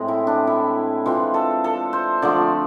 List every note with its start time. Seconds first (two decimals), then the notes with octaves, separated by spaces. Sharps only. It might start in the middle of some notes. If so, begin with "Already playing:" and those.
Already playing: A2 G#3 C4
0.08 E4
0.27 D4
0.47 E4
1.06 E3 G#3 C4 F4
1.34 A4
1.64 A4
1.93 C5
2.22 D3 F3 A3 D5